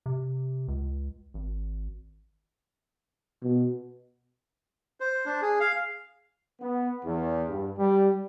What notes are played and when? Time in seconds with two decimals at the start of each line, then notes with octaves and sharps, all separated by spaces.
0.06 C3
0.68 C#2
1.34 G#1
3.43 B2
5.00 C5
5.26 D4
5.42 G#4
5.60 F5
6.60 B3
7.04 E2
7.47 G2
7.78 G3